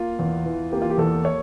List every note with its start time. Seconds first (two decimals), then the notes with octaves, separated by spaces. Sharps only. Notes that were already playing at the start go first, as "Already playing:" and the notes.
Already playing: A#3 F4
0.19 E2
0.46 E3
0.72 A#3 G4
0.82 F4
0.90 G4
0.98 E2 A4
1.25 C#5